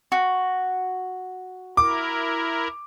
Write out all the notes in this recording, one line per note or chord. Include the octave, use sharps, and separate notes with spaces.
F#4
E4 A#4 D6